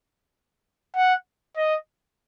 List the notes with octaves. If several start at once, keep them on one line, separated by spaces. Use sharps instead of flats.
F#5
D#5